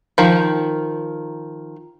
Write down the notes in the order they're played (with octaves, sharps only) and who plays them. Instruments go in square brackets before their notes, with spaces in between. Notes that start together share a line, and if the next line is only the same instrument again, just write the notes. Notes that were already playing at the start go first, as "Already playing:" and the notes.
[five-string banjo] D#3 F3